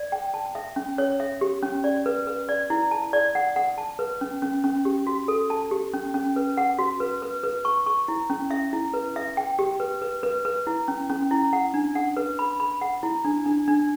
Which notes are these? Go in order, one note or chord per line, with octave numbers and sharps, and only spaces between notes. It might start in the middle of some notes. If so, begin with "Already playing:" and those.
Already playing: D5
G5
A5
E5
C#4
C#5
E5
G4
C#4
D5
B4
B4
D5
E4
A5
D5
F#5
F#5
A5
B4
C#4
C#4
C#4
G4
F#4
A4
A5
G4
C#4
C#4
B4
F#5
F#4
B4
B4
B4
C#6
C#6
E4
C#4
E5
E4
B4
E5
G5
G4
B4
B4
B4
B4
E4
C#4
C#4
E4
F#5
D4
F#5
B4
B5
B5
F#5
E4
D4
D4
D4